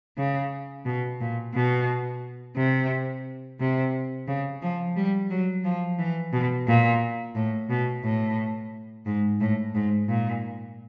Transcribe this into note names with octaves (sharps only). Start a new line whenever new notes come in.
C#3
B2
A#2
B2
C3
C3
C#3
F3
G3
F#3
F3
E3
B2
A#2
A2
B2
A2
G#2
A2
G#2
A#2